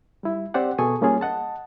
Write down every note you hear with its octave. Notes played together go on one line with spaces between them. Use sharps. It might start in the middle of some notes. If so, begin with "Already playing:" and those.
G3 E4
C4 G4 C5 D5 F#5
B2 G#4 A4 G#5 C#6 D#6
G3 A#3 C#4 F4 G#4
D#5 F#5 A5